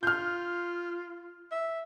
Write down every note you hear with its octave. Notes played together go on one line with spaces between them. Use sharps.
F4 F6 G6
E5